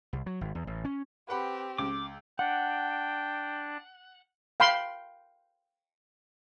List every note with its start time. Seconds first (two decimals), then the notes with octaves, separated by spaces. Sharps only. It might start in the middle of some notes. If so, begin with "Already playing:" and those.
0.13 C2
0.26 F#3
0.41 G#1
0.55 E2
0.67 A1
0.85 C#4
1.29 C4 G4 B4 F#5 B5
1.78 C#2 D6
2.39 D4 F#5 G5
4.60 F5 G5 B5 C6